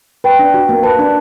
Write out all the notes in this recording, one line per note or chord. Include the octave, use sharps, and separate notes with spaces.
B4 G5
D4
F#4
A#3
B4 A5
D4